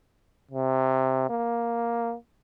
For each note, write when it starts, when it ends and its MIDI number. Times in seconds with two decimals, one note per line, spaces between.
0.51 1.25 48
1.29 2.14 58